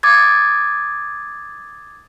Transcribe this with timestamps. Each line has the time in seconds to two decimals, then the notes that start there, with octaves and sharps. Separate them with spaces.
0.03 D6 D#6 G#6 A6